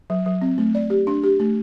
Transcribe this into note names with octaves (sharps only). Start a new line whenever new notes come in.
F#3
F#3
C4
A3
D5
G4
D4
G4
A3